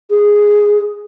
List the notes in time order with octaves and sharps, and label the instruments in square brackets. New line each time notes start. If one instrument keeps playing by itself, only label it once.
[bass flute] G#4